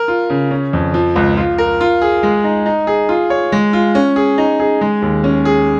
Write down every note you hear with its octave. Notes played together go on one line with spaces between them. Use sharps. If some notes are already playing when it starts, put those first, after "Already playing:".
Already playing: A#4
F4
C#3
C#4
F2
F3
C#2
F4
A#4
F4
G#4
G#3
D#4
D#4
G#4
F4
C#5
G#3
F4
C#4
G#4
D#4
G#4
G#3
D#2
C#4
G#4